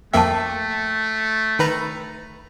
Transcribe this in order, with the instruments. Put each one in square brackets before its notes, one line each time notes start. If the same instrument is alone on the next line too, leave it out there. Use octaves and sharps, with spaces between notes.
[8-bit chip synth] F2 A#3 E5 [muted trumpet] A3 [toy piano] G5 A5
[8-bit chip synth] D#3 B4 A#5